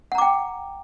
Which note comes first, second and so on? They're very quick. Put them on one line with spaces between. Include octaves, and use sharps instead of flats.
F#5 A#5 D6 G5